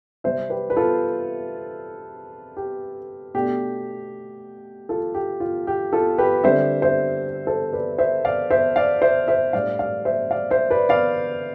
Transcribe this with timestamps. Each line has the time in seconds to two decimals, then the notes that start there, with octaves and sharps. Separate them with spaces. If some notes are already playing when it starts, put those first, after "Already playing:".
0.24 C3 G3 C4 C5 E5
0.50 G4 B4
0.70 B4
0.77 F4 A4
2.57 G4
3.34 B2 A3 D4 G4
4.89 F4 A4
5.14 G4
5.40 F4
5.67 G4
5.93 F4 A4
6.18 G4 B4
6.44 D3 G3 C4 C5 E5
6.82 C5 E5
7.47 A4 C5
7.73 B4 D5
7.98 C5 E5
8.25 D5 F5
8.51 C5 E5
8.76 D5 F5
9.02 C5 E5
9.28 C5 E5
9.53 A2 G3 D4 D5 F5
9.79 D5 F5
10.05 C5 E5
10.31 D5 F5
10.51 C5 E5
10.70 B4 D5
10.89 D5 F5